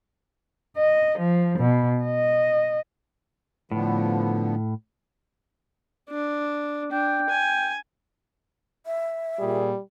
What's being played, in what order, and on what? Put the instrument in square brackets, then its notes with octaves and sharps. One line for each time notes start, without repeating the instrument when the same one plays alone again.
[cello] D#5
F3
B2
D#5
[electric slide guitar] A2 [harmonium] D3 F3 B3
[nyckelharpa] D4
[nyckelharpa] D4 [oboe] G5
[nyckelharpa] G#5
[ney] E5
[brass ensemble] A#2 G#4 [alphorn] G3